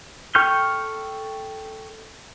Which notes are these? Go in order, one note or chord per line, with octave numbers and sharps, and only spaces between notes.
A4 G5 C#6 F6 G6